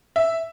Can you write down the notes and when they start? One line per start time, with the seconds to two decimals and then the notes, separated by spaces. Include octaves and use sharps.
0.16 E5